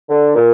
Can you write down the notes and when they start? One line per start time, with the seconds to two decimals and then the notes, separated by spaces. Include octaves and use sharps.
0.08 D3
0.35 A#2